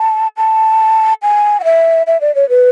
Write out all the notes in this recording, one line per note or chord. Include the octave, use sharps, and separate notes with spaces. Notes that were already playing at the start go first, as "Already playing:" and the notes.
Already playing: A5
A5
G#5
F#5
E5
E5
D5
C#5
B4